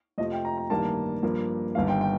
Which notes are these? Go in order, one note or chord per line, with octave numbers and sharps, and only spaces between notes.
F2 C3 F3 A3 D#5
G5
A#5
A#5
A1 G2 D#3 G3 A#3 A5
G2 F3 A#3
G1 G2 D#3 F5
G5
G5